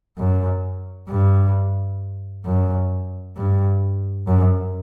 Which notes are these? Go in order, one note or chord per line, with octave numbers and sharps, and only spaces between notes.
F#2
G2
F#2
G2
F#2